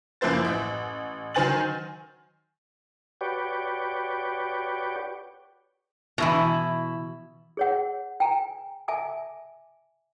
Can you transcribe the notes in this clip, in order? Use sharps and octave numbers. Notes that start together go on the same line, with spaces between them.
F#2 F3 A#3 E4 C5 A6
A1
D#3 F#3 C5 G#5 A6 F#7
F#4 G4 B4 C#5 D5 G5
B2 E3 E4 A#5
G#4 C#5 F#5
G5 G#5 A#5
E5 G#5 A5 D6